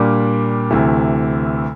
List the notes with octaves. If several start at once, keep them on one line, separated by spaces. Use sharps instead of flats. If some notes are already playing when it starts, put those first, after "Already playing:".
Already playing: A#2 G3 A#3 D4
D2 C3 E3 A3